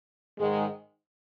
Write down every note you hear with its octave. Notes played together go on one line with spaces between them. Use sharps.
G#2 D#3 G#3